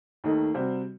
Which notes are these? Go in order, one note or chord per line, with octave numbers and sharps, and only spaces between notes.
D#2 D#3 A3 D#4
C3 G3 C4 F#4